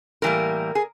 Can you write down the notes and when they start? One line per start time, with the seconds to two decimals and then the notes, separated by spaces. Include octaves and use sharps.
0.22 A2 E3 G3 A#3 A#4
0.75 G#4